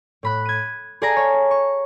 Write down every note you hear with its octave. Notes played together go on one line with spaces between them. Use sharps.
A2 B5 F#6
G#6 D#7
G#4 A4 D5 F5 G#5 A#5
C#5
C#6